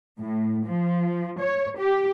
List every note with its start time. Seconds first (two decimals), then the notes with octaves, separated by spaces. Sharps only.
0.19 A2
0.66 F3
1.39 C#5
1.78 G4